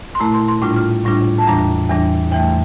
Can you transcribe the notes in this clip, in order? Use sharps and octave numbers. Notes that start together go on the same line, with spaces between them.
C6
A#2 A3 E4 A#5
C6
C6
A2 G3 D4 F4 D6
F6
A2 G3 D4 F4
A5
E2 E3 G3 D4 A#5
E2 E3 G3 D4
E2 E3 A3 G5